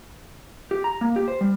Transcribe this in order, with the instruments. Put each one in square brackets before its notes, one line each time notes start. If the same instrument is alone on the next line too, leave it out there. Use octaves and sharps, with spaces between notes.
[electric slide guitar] G4
A#5
A#3
G4
C5
G3